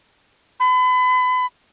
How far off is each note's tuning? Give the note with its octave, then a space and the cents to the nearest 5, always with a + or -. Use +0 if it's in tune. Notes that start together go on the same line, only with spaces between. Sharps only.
B5 +35